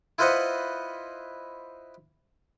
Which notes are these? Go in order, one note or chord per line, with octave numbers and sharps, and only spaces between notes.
E4 F4 B4 C5 D#5 F#5